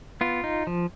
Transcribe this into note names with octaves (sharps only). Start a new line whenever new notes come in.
B3 F4
D#4
F3